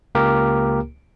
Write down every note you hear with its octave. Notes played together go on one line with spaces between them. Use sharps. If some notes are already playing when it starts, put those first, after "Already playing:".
C#2 A#3 G4 A#4